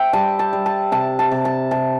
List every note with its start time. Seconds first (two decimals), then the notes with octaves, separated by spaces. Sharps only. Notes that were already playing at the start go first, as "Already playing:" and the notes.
Already playing: C5 E5 G5
0.13 G3 A5
0.39 A5
0.53 G3
0.66 A5
0.92 C3 A5
1.19 A5
1.32 C3
1.45 A5
1.71 C3 A5